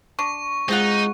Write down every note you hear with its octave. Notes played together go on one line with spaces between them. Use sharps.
D4 C#6
G#3 C4 D#4 F4 F#5